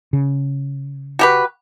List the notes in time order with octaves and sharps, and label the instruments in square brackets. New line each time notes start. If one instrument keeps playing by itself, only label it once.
[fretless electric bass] C#3
[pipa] F#4 G4 B4